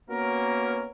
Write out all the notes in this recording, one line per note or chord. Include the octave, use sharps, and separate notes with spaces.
A#3 B3 C#4 F#4 A#4